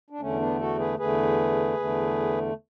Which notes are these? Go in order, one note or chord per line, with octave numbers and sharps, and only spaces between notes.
D4
E2 D3 A3 C#4
B3 D4
F#4 A4
G#4 B4
E2 D3 A3 G#4 B4
E2 D3 A3